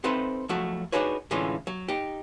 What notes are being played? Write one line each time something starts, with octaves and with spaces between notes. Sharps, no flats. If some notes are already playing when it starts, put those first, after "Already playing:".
C4 D#4 A4 B4 C5 E5
F3 F#3 A3 F#4
D4 D#4 F#4 G#4 B4 C#5
A2 D3 E3 G#3 C#4 F4
F#3
D#4 G4